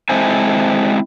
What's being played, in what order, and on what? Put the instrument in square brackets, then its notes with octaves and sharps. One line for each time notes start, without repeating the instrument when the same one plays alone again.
[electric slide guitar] G#3 C4 E4 A4 C5 G#5